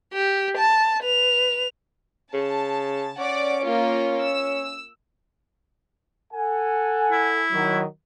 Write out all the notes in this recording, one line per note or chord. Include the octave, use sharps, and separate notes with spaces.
G4
A5
B4 F7
C#3 A5
C#4 D5 F#5 D6
A#3 F4
E6
A4 F#5 G#5
E4
D#3 F#3